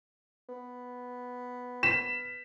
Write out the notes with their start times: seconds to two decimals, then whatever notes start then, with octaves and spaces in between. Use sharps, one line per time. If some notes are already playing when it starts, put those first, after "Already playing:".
0.49 B3
1.83 B6 E7